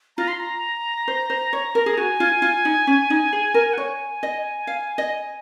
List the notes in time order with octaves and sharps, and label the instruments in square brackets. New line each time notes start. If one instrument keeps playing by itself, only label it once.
[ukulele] F4 [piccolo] A#5
[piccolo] C6
A#5
[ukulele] C5
C5
C#5
A#4
G#4
[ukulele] F#4 [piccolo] G#5
[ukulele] F4
F4
D#4
C#4
D#4
G#4
A#4
[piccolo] F#5
[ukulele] C#5 [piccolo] G#5
[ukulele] D#5
F5
D#5